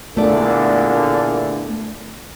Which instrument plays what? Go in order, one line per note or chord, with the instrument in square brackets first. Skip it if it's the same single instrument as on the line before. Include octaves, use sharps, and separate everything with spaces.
[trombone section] E2 A#2 D3 [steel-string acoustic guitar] A3 D5